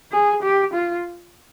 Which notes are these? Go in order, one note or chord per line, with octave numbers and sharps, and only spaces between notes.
G#4
G4
F4